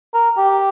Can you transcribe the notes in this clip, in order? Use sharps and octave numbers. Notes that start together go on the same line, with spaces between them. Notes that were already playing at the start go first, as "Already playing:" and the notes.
A#4
G4